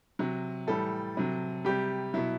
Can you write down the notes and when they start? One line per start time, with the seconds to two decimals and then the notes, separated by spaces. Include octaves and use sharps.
0.19 C3 F#3
0.67 A2 E3 G3 A4
1.17 C3 F#3
1.65 C3 G3 G4
2.14 B2 F#3 E4